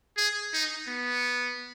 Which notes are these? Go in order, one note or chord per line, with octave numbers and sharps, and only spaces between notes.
G#4
D#4
B3